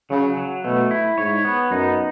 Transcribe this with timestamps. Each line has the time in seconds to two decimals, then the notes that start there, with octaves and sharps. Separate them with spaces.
0.10 C#3 F#3
0.37 F#3
0.64 B2 A3
0.91 E4
1.18 G#2 C#5
1.45 B3
1.71 F#2 D#4